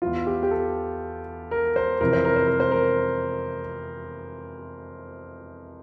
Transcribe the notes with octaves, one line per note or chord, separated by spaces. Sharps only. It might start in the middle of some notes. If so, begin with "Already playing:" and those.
E2 E3 F4
G4
G4
A4
A#4
C5
F2 C3 E3 A#4
C5
A#4
C5
A#4
C5
A#4